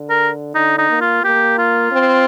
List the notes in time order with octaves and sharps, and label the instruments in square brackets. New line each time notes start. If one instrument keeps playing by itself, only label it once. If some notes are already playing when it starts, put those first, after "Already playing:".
Already playing: [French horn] D3
[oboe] A#4
[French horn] D3 [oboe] D#4
[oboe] D#4
[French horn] A#3
[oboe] F4
[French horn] A#3 [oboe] G4
[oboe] F4
[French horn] C4